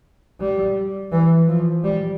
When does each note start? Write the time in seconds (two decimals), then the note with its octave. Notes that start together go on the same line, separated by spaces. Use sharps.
0.40 G3
1.12 E3
1.48 F3
1.84 G3